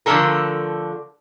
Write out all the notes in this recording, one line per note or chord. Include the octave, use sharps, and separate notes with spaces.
D3 F3 A3 C#4 A4 A#4